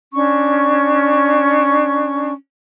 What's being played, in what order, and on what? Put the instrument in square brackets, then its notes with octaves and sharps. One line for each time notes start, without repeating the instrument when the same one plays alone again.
[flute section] C#4 D4 C#6